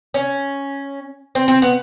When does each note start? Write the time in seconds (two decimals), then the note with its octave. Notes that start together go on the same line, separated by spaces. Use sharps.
0.14 C#4
1.35 C4
1.48 C4
1.62 B3